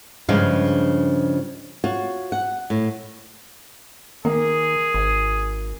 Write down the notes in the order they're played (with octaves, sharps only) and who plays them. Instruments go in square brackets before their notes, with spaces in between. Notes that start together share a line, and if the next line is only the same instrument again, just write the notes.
[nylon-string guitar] G2 C#3 F3 G#3 D4 F4
F4 F#4 C#5
F#5
A2
[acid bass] D#3 [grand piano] A#3 [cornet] G#4
[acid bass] G#1